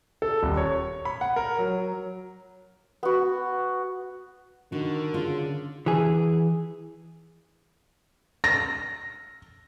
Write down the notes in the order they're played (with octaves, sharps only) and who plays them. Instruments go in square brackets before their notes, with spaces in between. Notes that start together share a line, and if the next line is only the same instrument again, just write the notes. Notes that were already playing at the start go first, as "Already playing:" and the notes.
[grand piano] A4
D#1
C#5
B5
F#5
A#4
F#3
[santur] B3 F#4
[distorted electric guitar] D3 [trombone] D#3 [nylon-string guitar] F#4
[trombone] C#3 [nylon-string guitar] F4
[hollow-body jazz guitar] E3 G#4
[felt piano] A#6